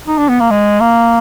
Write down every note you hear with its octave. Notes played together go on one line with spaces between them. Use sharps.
D#4
D4
B3
A#3
G#3
A#3